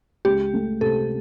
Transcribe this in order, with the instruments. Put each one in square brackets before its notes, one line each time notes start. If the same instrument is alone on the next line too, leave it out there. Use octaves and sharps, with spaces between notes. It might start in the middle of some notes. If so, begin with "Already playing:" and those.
[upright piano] C#2 [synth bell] G4
[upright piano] A3
[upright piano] C3 [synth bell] A4